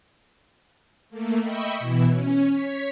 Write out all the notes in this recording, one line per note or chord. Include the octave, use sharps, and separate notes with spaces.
A3 A#3
D#5 E5 G5 B5 C#6
B2 E3 E4
C#4
C#5 B6